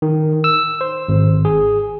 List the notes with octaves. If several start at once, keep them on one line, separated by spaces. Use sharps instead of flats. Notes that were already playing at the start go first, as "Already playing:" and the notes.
D#3
E6
C5
G#1
G#4